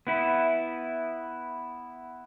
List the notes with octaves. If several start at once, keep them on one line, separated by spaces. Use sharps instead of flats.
B3 E4